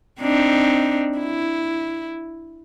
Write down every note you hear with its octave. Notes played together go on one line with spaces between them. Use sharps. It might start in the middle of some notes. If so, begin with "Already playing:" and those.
C4 D4 D#4
E4